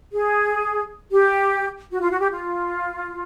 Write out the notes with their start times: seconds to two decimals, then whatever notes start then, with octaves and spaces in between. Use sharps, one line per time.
0.12 G#4
1.11 G4
1.91 F#4
2.01 F4
2.11 F#4
2.20 G4
2.31 F4